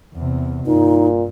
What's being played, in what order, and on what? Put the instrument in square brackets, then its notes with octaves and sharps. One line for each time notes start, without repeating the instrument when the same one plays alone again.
[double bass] E2 C3
[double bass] G2 [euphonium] A#2 [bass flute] D#4